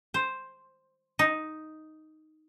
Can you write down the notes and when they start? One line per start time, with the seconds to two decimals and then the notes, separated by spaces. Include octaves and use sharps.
0.14 C5
1.19 D#4